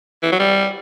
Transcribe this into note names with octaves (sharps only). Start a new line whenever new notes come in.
E3
F#3
G3